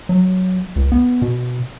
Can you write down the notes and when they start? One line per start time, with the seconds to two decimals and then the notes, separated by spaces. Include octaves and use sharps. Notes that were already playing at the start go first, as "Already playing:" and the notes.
0.09 F#3
0.76 C#2
0.92 B3
1.22 B2